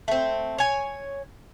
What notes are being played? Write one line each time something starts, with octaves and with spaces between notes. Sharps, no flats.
A3 C4
C#5 G#5